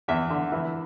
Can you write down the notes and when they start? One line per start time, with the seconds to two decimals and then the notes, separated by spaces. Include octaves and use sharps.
0.08 E2 E5
0.30 D3
0.52 E3